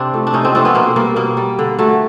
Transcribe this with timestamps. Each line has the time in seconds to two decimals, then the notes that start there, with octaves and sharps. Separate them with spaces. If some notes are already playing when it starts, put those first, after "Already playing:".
Already playing: C3 C4 D4
0.13 F3 A3
0.27 D4
0.33 C3 C#4 D#4
0.44 C4 D4
0.54 F3 A3 C4 D4
0.65 B3 C#4
0.75 B2 A#3 C4
0.96 G3 A#3
1.16 B2 A#3
1.37 G3
1.59 D3
1.79 F#3 A3